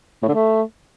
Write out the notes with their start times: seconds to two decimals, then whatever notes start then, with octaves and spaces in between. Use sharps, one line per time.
0.23 A2
0.28 D3
0.34 A3